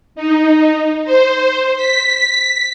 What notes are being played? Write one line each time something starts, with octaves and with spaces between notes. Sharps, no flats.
D#4
C5
B6